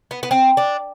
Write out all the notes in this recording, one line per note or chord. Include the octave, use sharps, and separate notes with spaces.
B3
B3
C4
D4